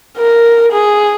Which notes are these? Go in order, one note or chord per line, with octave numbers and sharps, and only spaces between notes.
A#4
G#4